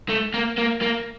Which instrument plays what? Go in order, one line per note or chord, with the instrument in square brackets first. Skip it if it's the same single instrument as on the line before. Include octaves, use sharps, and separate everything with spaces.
[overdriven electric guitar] A3
A#3
A#3
A#3